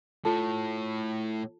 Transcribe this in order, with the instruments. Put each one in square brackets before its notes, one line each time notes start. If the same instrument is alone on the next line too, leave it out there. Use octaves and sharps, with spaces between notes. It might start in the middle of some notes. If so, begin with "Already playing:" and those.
[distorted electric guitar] A2 [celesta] F4 A4 A5